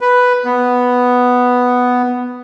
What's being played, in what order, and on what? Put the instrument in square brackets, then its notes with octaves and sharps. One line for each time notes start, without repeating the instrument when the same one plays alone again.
[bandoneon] B4
B3